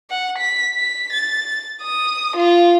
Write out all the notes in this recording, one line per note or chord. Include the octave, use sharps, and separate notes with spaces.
F#5
B6
B6
A6
D#6
F4